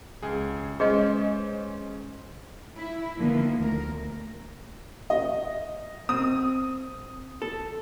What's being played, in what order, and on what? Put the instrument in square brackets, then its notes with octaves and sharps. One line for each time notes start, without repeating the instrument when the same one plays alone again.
[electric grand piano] C#2 G#4
[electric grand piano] G#3 C#4 C5 [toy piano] G#4 B4 D#5
[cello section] E4
D3 D#3 F3 A#3 B3
D2 A#4
[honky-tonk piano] D#5
[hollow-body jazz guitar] C4 [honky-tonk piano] D#6
[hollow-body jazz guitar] A4